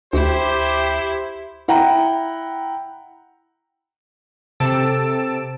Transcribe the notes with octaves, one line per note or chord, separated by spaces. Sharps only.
D2 E4 G4 C5
E4 F#5 G5 A#5
C3 A4 A5 E6 D7